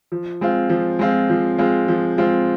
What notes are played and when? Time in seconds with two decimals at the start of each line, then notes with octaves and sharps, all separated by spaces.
0.12 F3
0.41 G#3 C4 F4
0.69 F3
0.99 G#3 C4 F4
1.30 F3
1.58 G#3 C4 F4
1.88 F3
2.18 G#3 C4 F4